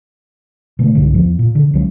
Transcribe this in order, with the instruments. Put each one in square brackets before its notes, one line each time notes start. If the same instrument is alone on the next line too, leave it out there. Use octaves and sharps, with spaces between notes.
[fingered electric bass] B2 D3 A3
C2 G#2 D3
E2 F3
A#2
D3
C#2 F#3 C#4